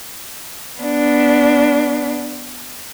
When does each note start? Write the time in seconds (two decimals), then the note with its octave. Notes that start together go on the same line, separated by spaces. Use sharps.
0.80 B3 D4